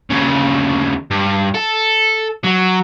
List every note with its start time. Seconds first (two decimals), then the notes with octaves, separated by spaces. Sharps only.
0.10 D#2 C#3
1.11 G2
1.54 A4
2.44 F#3